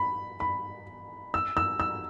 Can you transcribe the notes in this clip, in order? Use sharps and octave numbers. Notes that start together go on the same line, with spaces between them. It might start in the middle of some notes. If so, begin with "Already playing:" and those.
Already playing: B5
B5
E6
E6
E6